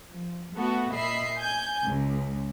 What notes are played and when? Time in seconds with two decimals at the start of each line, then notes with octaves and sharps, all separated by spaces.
0.11 F3
0.55 A3 B3 F#4 A4
0.94 A#2 D#5 E5 B5 C7
1.38 G#5 G6
1.85 C#2